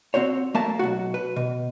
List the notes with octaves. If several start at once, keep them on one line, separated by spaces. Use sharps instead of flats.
C4 F#4 C5 C#5
A3 A#3 A5
B1 F#4
B4
B2